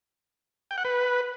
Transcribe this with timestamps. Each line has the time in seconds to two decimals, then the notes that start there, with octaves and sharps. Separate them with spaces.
0.71 G5
0.78 F#5
0.85 B4